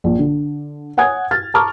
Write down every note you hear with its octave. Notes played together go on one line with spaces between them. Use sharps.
A#1
D3
C#5 F#5 G#5 D#6 G#6
F6 A6
A5 A#5 C#6 D6 F6